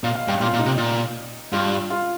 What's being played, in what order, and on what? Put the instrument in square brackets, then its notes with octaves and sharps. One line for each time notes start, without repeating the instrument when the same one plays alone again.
[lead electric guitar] A#2 [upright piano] F5
[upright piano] F5
[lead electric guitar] G2 [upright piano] G5
[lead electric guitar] A#2 [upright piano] F4
[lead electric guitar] A#2
[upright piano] D#4
[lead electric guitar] C3
A#2
[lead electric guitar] G2 [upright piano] F4
[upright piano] F4